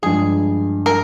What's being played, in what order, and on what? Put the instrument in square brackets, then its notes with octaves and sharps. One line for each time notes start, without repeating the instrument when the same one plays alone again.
[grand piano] G2 F3 G#3 [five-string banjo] G#4
[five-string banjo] A#4